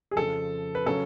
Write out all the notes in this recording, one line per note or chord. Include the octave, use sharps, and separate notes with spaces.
G#4
F2 C#3 F3 A4
B4
C#3 F#3 C#4 A4